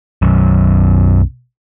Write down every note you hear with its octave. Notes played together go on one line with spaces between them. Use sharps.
B1 F#2